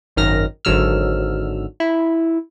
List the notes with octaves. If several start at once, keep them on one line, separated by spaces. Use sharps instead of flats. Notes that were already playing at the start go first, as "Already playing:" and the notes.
G#1 F#2 D#3 F6 A#6
G#1 G#2 D3 F#3 E6 F6
E4